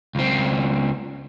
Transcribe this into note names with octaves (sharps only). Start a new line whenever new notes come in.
C#2 C4